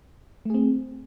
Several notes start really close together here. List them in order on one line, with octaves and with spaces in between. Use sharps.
A3 G#4 C4